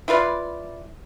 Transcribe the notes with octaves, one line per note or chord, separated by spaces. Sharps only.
E4 F4 B4 D5